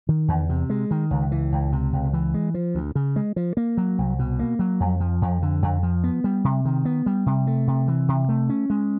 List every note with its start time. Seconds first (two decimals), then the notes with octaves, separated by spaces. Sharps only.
0.09 D#3
0.28 E2
0.49 C3
0.70 G#3
0.91 D#3
1.11 C#2
1.32 E3
1.52 C#2
1.72 C3
1.93 C#2
2.13 E3
2.34 G#3
2.54 F3
2.75 D2
2.95 C#3
3.16 G#3
3.36 F3
3.57 A#3
3.77 F#3
3.98 C2
4.19 B2
4.39 A#3
4.59 F#3
4.80 F2
5.00 F3
5.22 F2
5.42 D3
5.62 F2
5.83 F3
6.04 B3
6.24 G3
6.44 C3
6.65 D#3
6.85 B3
7.06 G3
7.26 C3
7.47 A3
7.67 C3
7.88 E3
8.08 C3
8.29 A3
8.49 C#4
8.70 G#3